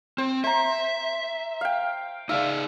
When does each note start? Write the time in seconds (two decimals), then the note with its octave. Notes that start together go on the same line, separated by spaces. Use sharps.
0.18 C4 C5
0.44 C5 E5 A#5
1.61 F5 G5
2.29 D#4 G#4 D5 E5 F5